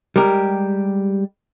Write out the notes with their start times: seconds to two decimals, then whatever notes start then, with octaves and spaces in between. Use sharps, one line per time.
0.16 G3 G#3 G4 A#4